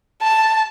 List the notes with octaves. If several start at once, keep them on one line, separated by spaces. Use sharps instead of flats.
A5